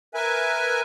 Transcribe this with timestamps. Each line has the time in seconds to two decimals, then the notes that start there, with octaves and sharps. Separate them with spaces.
0.14 A#4 B4 E5 G#5